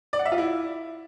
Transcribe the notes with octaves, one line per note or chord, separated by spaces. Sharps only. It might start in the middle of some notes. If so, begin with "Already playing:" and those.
D5
F#5
E5
F4
E4